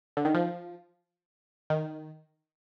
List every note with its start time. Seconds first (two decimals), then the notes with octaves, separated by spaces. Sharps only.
0.17 D3
0.25 D#3
0.34 F3
1.70 D#3